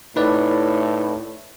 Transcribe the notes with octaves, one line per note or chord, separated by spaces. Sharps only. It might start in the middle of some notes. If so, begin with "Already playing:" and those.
A2 D#4 B4 D5